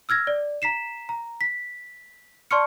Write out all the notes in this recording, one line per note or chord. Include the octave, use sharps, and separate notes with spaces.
E6 F6 G#6 A#6
D5
A#5 B6 C7 E7
A#5
B6
D5 A5 C6 C#6 F6 C#7